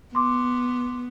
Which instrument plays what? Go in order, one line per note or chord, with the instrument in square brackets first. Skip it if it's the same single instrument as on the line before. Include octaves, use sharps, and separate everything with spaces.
[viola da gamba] B3 [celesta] C6 D6